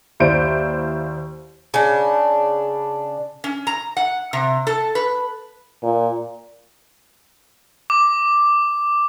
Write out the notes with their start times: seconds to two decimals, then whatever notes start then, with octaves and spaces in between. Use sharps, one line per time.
0.20 D#2 E4 C5 D5 D7
1.74 C#3 D4
3.44 C#4
3.67 A#5
3.97 F#5
4.33 C3
4.67 A4
4.95 B4
5.83 A#2
7.90 D6